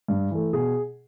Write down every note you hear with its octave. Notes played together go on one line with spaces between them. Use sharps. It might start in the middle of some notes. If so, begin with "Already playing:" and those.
G2
E3 A3
B2 G#4